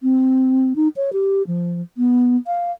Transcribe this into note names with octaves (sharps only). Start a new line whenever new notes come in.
C4
D#4
C#5
G4
F3
B3
F5